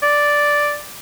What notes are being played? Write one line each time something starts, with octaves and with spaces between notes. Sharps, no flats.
D5